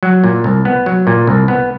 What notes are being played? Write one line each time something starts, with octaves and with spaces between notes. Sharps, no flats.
F#3
A#2
C2
B3
F#3
A#2
C2
B3